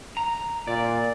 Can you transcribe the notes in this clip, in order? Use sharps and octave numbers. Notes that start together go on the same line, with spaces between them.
A#5
A#2 D5